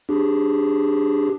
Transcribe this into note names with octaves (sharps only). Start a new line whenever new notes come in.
D4 G4 G#4